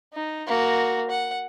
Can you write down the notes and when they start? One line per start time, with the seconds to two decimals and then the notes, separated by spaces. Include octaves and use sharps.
0.14 D#4
0.47 A#3 F#4
1.10 F#5